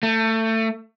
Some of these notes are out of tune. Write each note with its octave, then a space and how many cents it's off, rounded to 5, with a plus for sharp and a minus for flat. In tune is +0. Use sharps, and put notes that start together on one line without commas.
A3 +25